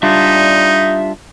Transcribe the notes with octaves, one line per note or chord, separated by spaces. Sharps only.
G3 D4 D#4 F4 E5